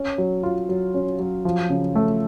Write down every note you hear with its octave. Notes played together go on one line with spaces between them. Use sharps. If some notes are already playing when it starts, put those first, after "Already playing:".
Already playing: C#4
F#3
F4
F#3
C#4
F#3
F3
C#3
A3